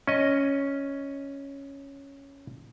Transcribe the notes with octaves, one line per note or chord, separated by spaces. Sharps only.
C#4 D#5